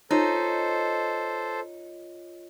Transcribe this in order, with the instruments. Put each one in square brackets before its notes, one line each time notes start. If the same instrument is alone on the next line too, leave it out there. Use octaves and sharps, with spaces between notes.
[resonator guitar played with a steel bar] D#4 [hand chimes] F4 C#5 D#5 [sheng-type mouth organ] A4 C5